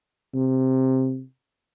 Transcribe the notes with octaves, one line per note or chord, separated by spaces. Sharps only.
C3